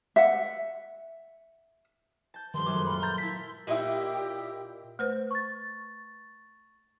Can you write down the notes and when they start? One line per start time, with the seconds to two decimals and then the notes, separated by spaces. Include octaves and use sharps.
0.16 E5 F#5
2.34 A5 G6
2.54 F1 G2 D#3 C6
2.66 F#2 G#3 A3 D6
2.87 A#2 F4 B5
3.03 A#5 G6 A6
3.18 E4 A5 B6
3.67 A#2 D#4 E4 G4
4.99 A3 B4 C5
5.31 C#6 A6